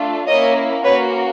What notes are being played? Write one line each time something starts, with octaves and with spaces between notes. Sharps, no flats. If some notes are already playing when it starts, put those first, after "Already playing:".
Already playing: A3 D4 F4
A#3 C#4 E4 C#5 D#5
A#3 C#4 F#4 B4 C#5